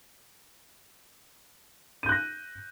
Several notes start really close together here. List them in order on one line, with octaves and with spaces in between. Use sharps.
D#7 G6 F#6 A#6